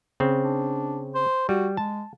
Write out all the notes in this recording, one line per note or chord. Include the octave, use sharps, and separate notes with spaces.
C#3 C4
D4
C5
G3 F#4
G#3 A5